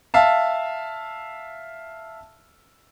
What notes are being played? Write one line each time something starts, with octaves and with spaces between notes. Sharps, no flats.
E5 F5 A5